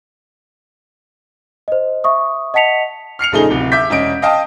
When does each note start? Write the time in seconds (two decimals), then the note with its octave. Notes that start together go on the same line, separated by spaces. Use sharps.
1.68 C5 D#5
2.04 E5 C#6 D#6
2.54 D#5 F#5 A5 B6 C#7 F7
3.19 F6 C7 C#7 F7
3.32 A#1 C#3 A3 D#4 G#4 G7
3.50 D1 C3
3.72 E5 D6 G6 B6
3.90 E1 C#4 D#5 D7
4.22 D#5 F5 G5 A5 D#6